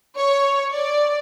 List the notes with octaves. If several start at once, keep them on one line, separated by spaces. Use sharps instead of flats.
C#5
D5